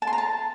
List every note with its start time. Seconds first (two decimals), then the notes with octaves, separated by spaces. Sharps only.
0.02 A5
0.07 C6
0.13 A#5
0.18 A5